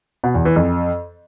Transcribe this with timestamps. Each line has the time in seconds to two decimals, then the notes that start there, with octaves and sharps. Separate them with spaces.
0.24 B2
0.34 E2
0.45 E3
0.56 F2